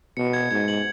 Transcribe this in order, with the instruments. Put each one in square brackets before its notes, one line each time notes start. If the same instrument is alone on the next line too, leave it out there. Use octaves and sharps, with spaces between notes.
[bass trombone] B2 [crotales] C#7
[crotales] G#6
[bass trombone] G#2 [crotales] G#6
[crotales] F#7